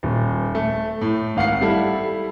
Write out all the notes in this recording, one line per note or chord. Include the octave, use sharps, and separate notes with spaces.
D#1
A3
A2
G#1 F5 F#5 C7
G3 E4 A4